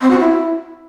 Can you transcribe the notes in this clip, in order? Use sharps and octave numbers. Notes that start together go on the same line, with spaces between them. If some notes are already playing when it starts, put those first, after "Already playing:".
C4
F#4
E4